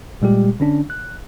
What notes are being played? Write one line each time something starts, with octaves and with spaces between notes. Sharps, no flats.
A#2 G3 G#3 G4
D3 C#4 D4
F#6